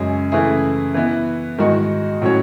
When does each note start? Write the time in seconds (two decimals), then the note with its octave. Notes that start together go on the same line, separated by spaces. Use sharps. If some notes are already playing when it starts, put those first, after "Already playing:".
Already playing: F#2 C#3 G#3 C#4 G#4
0.32 C#3 E3 A3 E4 G#4
0.94 E3 B3 E4
1.58 G#2 D#3 G#3 D#4 F#4
2.22 A2 F#3 C#4 F#4 C#5